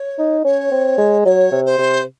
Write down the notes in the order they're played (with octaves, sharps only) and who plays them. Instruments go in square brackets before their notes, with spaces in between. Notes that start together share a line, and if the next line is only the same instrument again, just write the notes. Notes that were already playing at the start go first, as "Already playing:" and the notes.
Already playing: [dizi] C#5
[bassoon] D#4
[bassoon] C#4 [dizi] C#5
[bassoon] C4
G#3
[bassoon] F#3 [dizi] C#5 D#5
[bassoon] C3
[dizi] C5
[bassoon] C3